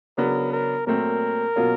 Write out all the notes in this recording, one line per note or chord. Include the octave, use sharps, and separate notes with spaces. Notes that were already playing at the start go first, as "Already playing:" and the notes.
C#3 F#3 B3 D4 A#4
A#4
A#2 F#3 A3 C4 A#4
B2 F#3 A#3 C#4 F4